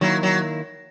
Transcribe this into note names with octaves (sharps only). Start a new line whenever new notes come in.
D#3 F#3 A#3 E4
F#3